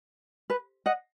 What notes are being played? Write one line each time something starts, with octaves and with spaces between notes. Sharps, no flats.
B4
D#5 F#5